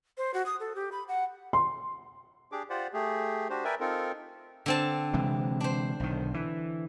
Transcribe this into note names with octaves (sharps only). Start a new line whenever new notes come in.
C5
F#4
D#6
A4
G4
B5
F#5
C6
D4 G4 G#4 D6
F4 G4 C5 D5 F#5
A3 G4 G#4
D4 F#4 G4 C5
A#4 B4 D5 E5 G5 G#5
C4 D#4 F4 A4 A#4
D3 C4 A5
C3 E3 G#3
D4 C5
B1 D#3
E3